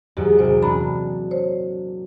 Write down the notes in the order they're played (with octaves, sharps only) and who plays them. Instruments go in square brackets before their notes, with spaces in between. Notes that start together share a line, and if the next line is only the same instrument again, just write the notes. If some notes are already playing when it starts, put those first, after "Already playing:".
[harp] E2 G#2 F#3 [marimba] G4
[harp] C2 [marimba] C5
[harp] A#2 D4 [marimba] A#5 B5
[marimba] C5 C#5